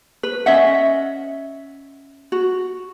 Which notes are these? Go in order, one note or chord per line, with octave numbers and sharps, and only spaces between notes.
B4
C#4 D#5 E5 F#5
F#4